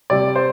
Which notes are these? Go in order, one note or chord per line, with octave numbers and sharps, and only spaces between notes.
C3 G3 C4 D5
C5